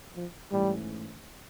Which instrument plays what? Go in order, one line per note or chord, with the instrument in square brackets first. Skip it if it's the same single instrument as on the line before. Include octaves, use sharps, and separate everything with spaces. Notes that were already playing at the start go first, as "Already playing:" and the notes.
[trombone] F3
[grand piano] G#2 E3 A3 C#4 [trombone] G3